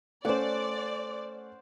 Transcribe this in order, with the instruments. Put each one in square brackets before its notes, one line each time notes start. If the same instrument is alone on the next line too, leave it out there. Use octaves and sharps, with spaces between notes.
[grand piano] A3 C#4 [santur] C5 F#5 [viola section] D5